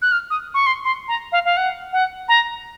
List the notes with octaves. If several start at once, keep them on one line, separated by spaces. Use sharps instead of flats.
F#6
F6
D#6
C#6
C6
C6
A#5
F5
F5
F#5
F#5
A#5